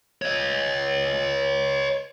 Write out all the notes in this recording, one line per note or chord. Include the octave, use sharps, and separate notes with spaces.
C#5 D#5